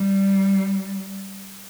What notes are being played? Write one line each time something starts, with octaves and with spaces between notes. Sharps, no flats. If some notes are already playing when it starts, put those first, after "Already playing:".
Already playing: G3